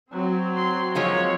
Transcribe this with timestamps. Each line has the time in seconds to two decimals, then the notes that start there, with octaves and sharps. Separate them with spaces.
0.11 F#3 C4
0.57 C6
0.95 F3 G#3 A#3 C#5